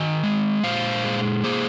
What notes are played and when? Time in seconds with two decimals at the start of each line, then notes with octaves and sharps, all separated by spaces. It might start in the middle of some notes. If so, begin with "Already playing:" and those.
Already playing: D#3 D#5 G#5
0.24 G#3
0.63 A#2 C5 F5
1.04 G#3
1.44 A#3 G#4 C5